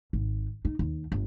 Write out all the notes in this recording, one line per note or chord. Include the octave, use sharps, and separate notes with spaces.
G#1
D#4
D#2
G1